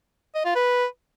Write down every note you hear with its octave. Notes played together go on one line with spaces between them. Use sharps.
D#5
F4
B4